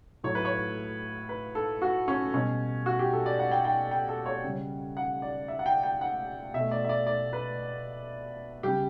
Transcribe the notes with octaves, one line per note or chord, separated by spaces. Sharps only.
A2 F#3 A3 C#5
B4
C#5
B4
A4
F#4
C#4
B2 G3 C#4
F#4
G4
A4
D5
F#5
G5
G5
G5
A4
C#5
C#3 G3
F#5
D5
E5
F#5
G5
G5
F#5
B2 A3 E5
D5
E5
D5
D5
B4
C#3 G3 G4